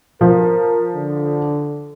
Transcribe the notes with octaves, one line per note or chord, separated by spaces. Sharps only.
F3 A#4
D3